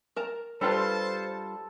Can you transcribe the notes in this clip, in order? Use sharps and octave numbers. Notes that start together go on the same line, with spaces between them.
A#4 A5 A#5
G3 D4 F4 G4 A4 B4 C5 A5